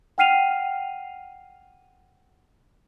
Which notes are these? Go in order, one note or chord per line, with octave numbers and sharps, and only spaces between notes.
F#5 G5 F6 C7 D#7 F7